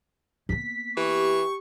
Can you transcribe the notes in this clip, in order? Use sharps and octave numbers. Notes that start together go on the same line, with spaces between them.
A#3 B3 B6
E3 G4 C#6